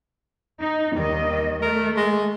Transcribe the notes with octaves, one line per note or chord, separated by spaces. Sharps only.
D#4
D#2 D#3 G3 D#5
A3 A#4
G#3